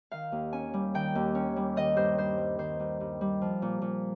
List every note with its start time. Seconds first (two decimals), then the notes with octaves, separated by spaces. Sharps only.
0.11 D#3 F5
0.32 D#2
0.53 C#4 G#5
0.74 G3
0.94 D#3 G5
1.15 D#2
1.35 C#4
1.56 G3
1.76 D#3 D#5
1.96 G2 C5
2.18 G2 C5
2.38 G3
2.59 D#3 C5
2.80 G2
3.01 G2
3.21 G3
3.41 F3
3.62 A#2
3.82 A#2